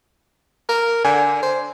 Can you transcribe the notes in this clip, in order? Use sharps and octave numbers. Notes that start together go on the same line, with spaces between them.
A#4
D3 G#5
C5